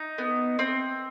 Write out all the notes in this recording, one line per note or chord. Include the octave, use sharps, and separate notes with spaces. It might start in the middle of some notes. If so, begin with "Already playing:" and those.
Already playing: D#4
B3
C4